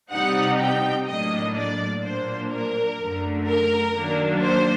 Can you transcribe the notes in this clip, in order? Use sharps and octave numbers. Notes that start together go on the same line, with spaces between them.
C3 G3 C4 D#4 F#5
G5
A2 F#3 A#3 D4 D#5
D5
A#2 F#3 A#3 D4 C5
A#4
F#2 D3 A3
A#4
D#3 F#3 A#3 D4
C5